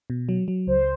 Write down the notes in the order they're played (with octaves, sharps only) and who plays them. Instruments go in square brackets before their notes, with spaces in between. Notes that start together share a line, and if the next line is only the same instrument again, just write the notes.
[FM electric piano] B2
F#3
F#3
[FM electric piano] C#2 [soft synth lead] C5